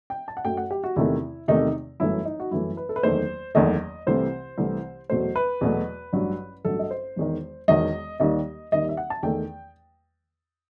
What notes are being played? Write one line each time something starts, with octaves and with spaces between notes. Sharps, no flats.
G5
A5
F#5
F#2 F#3 A3 G5
F#5
G4
F#4
E2 C3 D#3 A3 E4
E2 C3 D#3 A3 D#4
G1 F#2 E3 A3 E4
D#4
F#4
G1 F#2 E3 A3 E4
B4
A4
B4
F#1 E2 D#3 A3 C5
F#1 E2 D#3 A3 D#5
C2 C3 E3 A3 C5
C2 C3 E3 A3
E2 B2 F#3 A3 C5
B4
E2 B2 F#3 A3
A1 G2 F#3
A1 G2 F#3 A4
D#5
C5
E1 E2 D#3
E1 E2 D#3 D#5
D#2 D#3 G3 D#5
D#2 D#3 G3 D#5
E5
F#5
A5
E2 D#3 A3 G5